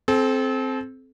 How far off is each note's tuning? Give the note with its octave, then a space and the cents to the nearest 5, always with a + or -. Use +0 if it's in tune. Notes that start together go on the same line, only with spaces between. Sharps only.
C4 +0 A4 -35